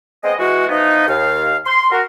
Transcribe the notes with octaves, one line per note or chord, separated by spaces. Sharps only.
G#3 B3 C4 D#5
E3 G#3 F#4
E3 F3 B3 D#4
D#2 F5
C6
F#4 A#4